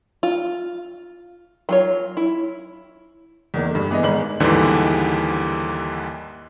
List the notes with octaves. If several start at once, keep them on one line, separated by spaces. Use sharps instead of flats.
F4
F#3 F4 C#5
E4
E2 D#3 A#3
G2 D3
E3 G#3 B3 G#4 B4 D#5
G#1 G#2 F#7
D#2 G#2 D3 E3 G3 D4